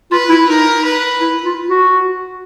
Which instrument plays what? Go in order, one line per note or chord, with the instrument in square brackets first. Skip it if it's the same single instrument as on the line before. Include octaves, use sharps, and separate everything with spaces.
[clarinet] F4 [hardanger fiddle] B4
[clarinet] E4
[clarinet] D#4 [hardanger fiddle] A#4
[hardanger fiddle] B4
[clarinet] E4
F4
F#4